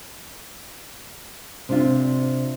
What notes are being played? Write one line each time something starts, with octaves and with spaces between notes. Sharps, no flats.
C3 D4 F4